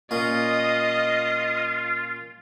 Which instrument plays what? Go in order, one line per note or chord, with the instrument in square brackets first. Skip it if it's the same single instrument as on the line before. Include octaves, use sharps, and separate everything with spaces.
[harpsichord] A#2 C#4 [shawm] F4 [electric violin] D#5